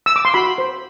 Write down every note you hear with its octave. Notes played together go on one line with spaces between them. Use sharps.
E6
D6
C6
F#4 B5
C5